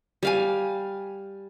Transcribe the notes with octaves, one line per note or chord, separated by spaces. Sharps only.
G3 F5 G#5